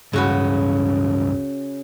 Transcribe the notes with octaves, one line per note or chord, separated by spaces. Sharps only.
C#2 G2 C#3 F#4 B4